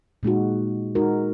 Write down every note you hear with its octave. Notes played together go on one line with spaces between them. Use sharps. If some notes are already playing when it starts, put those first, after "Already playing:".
A#2 G#3 D#4 F#4
G#3 D#4 F#4 A#4